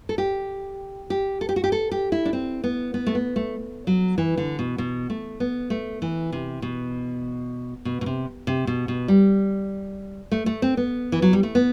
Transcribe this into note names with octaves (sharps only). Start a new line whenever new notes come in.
A4
G4
G4
A4
G4
F#4
G4
A4
G4
E4
D4
C4
B3
B3
A3
B3
A3
F#3
E3
D3
B2
B2
A3
B3
A3
E3
C3
B2
B2
B2
C3
C3
B2
B2
G3
A3
A3
C4
B3
E3
F#3
G3
A3
B3